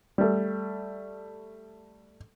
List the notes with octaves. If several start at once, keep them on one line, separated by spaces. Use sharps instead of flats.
G3 A3